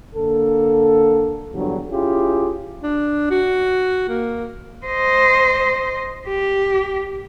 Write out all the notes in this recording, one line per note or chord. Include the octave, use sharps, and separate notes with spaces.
D3 A#3 A4
E2 G2 D3 F3 F#3
C#4 E4 F4 G4 G#4
D4
F#4
A#3
C5 D#5
G4